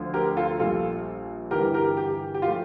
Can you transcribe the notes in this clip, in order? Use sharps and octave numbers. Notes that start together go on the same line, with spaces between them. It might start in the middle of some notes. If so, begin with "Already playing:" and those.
Already playing: D2 D3 F3
G4 A#4
F4 A4
A#1 A#2 G3 F4 A4
G1 G2 E3 G4 A#4
G4 A#4
G4
G4
F4
F3 A3